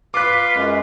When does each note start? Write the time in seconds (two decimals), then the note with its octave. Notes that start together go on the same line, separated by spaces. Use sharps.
0.14 F4 B4 D6 F#6
0.54 F#2 G#3